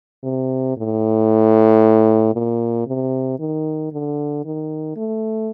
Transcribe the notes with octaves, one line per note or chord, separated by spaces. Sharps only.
C3
A2
A#2
C3
D#3
D3
D#3
A3